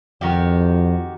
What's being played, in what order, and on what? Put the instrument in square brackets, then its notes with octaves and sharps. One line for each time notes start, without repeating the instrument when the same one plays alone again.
[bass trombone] F2 [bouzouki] D#3 F#4 G4